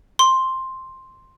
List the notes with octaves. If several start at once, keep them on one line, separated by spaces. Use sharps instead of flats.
C6